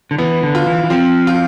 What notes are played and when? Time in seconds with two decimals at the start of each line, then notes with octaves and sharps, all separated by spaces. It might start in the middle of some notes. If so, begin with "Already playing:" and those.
0.11 D3
0.18 E3 B3
0.43 D3
0.55 F4
0.66 E3
0.84 E3
0.90 F3 C4
1.27 F4